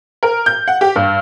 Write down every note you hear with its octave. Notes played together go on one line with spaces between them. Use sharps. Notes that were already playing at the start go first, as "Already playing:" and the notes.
A#4
G6
F#5
G4
G2